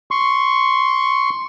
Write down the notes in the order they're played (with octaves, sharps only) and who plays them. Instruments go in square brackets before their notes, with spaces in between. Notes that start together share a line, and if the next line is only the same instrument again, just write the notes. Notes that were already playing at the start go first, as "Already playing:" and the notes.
[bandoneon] C6 C#6